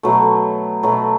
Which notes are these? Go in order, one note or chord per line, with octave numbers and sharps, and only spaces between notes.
B2 F#3 A3
B2 F#3 A3